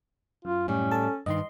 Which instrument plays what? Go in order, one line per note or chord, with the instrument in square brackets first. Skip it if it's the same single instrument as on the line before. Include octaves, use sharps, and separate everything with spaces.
[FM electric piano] F#2 [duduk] F4
[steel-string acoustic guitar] A2 G3 [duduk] C#4
[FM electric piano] A4 A5
[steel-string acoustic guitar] G2 D#3 [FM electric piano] D#5 C6